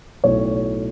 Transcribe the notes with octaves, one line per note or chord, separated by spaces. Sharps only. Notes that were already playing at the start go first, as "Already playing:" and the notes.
B1 A2 A3 C#5